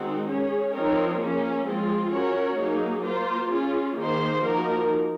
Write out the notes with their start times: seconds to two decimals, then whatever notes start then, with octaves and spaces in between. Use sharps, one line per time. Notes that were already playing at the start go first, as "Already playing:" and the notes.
Already playing: D#3 G#3 C4 D#4 F#4
0.28 C#4 G#4 C#5
0.73 F3 C4 D#4 A#4 C#5
1.20 A#3 C#4 G#4
1.66 F3 G#3 C4 F4 G#4
2.13 C#4 F#4 A#4 C#5
2.58 F#3 A#3 D#4 G#4
3.04 A#3 F4 C5
3.50 C#4 F4 G#4
3.97 D#3 A#3 D#4 G#4 C5
4.43 F3 A#3 D#4 F#4 A#4